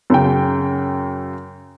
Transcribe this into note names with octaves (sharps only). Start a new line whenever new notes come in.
F#2 C#3 G5